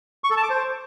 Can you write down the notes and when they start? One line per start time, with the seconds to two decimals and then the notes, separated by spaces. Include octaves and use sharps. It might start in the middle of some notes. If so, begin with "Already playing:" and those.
0.24 C#6
0.30 A4
0.37 A5
0.43 D6
0.50 C5